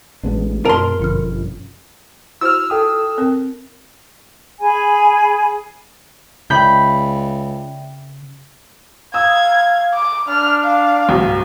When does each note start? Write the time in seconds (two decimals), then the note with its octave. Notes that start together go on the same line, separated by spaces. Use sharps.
0.23 A1 G#3 B3 D4
0.65 F#2 B2 A#4 A5 C6
1.00 G1 B2 F3 C#4 F6
2.41 E4 F#4 C5 E6 F6
2.70 A4 G5 D#6
3.18 C4 A#4
4.60 G#4 G#5 B5
6.50 C#2 C#3 D5 E5 G5 B5 G6
9.14 F5 D#6 E6 G#6
9.94 D6
10.28 D4 F6
10.64 F5
11.09 D1 C2 G2